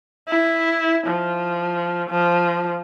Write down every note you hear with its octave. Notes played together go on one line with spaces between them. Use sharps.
E4
F3
F3